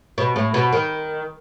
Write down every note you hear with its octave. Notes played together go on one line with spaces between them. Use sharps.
B2
A2
B2
D#3